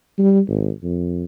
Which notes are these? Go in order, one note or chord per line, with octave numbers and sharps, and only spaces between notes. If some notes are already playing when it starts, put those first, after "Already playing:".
G3
G#1
F2